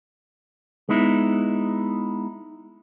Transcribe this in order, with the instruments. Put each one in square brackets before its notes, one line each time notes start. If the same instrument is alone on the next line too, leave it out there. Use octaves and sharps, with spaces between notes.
[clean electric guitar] G#3 B3 D#4 E4